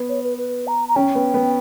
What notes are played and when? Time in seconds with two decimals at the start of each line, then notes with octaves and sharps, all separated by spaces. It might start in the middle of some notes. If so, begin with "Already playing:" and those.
Already playing: B3
0.09 C#5
0.23 B4
0.38 B4
0.67 A#5
0.88 A#5
0.96 C#4 G5
1.15 B3
1.34 B3